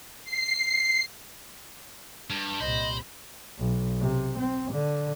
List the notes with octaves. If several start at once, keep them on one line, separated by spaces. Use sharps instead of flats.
C7
G2 G3 G4
C2 A#2 C5 D#5 B5
B1
C3
C4
D3